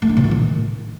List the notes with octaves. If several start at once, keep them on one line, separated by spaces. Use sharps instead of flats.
A3
D4
B2
A#2
D#3